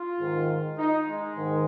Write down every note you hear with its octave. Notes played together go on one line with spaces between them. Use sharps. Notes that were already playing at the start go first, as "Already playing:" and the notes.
Already playing: F4
G#2 D#3
D#4
G#3
G#2 D#3